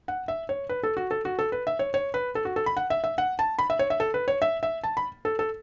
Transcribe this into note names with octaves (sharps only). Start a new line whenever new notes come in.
F#5
E5
C#5
B4
A4
F#4
A4
F#4
A4
B4
E5
C#5
C#5
B4
A4
F#4
A4
B5
F#5
E5
E5
F#5
A5
B5
E5
C#5
E5
A4
B4
C#5
E5
E5
A5
B5
A4
A4